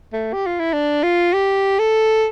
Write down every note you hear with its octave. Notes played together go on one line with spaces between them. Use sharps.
A3
G4
F4
E4
D4
F4
G4
A4